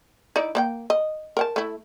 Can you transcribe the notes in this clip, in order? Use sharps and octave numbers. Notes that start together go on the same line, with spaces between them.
D#4 E4 D5
A#3 D5 G5
D#5
A#4 F#5 A5
A3 E4